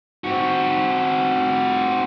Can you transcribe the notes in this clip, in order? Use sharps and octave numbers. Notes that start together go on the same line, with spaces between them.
C4 F#4